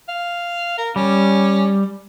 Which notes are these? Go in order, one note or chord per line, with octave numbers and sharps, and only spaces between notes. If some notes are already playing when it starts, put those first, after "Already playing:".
F5
A#4
G3 C#4